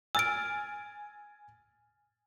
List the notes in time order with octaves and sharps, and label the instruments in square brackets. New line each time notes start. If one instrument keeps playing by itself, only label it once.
[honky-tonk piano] G#5 F6 A6 [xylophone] E6 D7